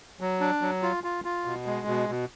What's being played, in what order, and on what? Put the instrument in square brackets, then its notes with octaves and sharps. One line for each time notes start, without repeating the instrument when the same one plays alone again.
[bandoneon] F#3
D4
F#3
F4
F4
F4
B2
G#3
B2
B2